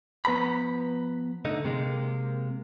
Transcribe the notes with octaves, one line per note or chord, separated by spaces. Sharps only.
F3 B3 B4 A#5 B5
D3 A3 D#4
C3 G#3 A#3